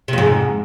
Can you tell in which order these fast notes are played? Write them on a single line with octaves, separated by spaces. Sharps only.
C3 F2 G#2